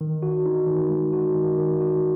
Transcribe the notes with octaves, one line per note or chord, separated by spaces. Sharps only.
D#3
F#4
D#4
D#3
G#3
F#4
D#3
D#3
F#4